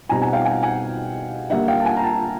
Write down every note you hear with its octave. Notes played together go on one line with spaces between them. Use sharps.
B2 G3 C4 D#4 G#5 A#5
F#5 G#5
F5 G5
F#5 G#5
F#5 G#5
D3 G3 A#3 E5 F#5
F5 G5
A5
F#5 G#5
A#5
G5 A5